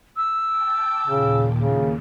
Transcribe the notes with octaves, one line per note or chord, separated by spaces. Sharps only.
E6
G5 A5 D6
D#2 A#2 C#3
C#3